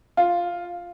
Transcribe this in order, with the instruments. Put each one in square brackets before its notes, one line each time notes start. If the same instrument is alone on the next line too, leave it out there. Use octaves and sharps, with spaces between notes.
[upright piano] F4